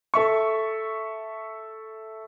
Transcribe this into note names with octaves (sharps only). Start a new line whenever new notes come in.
A4 E5 C#6